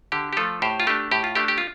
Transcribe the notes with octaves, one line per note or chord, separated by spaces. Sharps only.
D3 G4
G4
F3 A3 F4 A4
A2 G4 C5
F4
A3 D4 G4
A2 G4
F4
A3 D4 G4
G4
F4